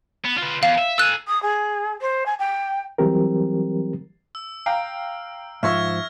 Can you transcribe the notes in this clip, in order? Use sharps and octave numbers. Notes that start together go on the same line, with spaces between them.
B3
F4 B4
E2 F5
E5
A4 G#5 E6 F#6
D#6
G#4
C5
G#5
G5
E3 F#3 G3 C4 G4 A#4
E6
F5 G5 A#5
G#2 F3 E5 C#6 E6 F6 G#6 A#6